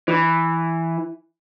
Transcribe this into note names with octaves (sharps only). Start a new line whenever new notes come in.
E3